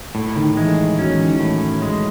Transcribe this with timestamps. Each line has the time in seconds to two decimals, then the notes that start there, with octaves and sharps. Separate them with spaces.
0.15 A2
0.36 D#3
0.56 E3 G#3
0.98 F#3 C#4
1.11 E3
1.22 D#3
1.34 E3
1.40 A2
1.82 G#3